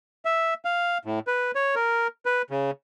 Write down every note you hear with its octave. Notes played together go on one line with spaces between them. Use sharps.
E5
F5
A2
B4
C#5
A#4
B4
C#3